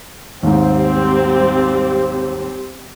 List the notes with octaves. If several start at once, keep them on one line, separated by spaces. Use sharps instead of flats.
D#2 G#2 G3 C4 G4